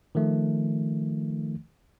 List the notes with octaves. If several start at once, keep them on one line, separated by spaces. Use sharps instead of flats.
D#3 F3 A3